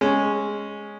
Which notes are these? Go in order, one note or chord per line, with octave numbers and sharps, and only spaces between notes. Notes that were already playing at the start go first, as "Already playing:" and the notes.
G#3 C#4